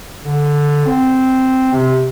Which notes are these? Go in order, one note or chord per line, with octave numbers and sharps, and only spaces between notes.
D3
C4
C3